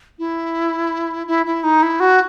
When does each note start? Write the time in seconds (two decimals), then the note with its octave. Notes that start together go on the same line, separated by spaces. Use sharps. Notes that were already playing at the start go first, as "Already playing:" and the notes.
0.19 E4
1.27 E4
1.46 E4
1.64 D#4
1.83 E4
2.00 F#4